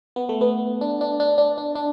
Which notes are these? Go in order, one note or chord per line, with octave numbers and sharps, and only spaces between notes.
B3
A3
B3
D4
D4
D4
D4
D4
D4